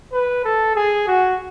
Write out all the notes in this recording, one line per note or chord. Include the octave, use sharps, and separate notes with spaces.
B4
A4
G#4
F#4